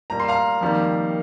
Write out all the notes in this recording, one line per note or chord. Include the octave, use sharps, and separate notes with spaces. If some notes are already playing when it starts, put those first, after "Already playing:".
A#2 G3 A#3 A#5
C6
F5 A#5
F2 D#3 G3 A#3